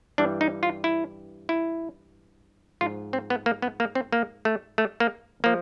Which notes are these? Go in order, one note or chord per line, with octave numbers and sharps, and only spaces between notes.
G2 E3 G3 D4
D#4
F4
E4
E4
G#2 F3 F4
C4
B3
A#3
B3
A#3
C4
A#3
A3
A3
A#3
F3 A#3